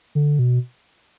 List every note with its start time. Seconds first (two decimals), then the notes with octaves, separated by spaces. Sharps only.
0.15 D3
0.39 B2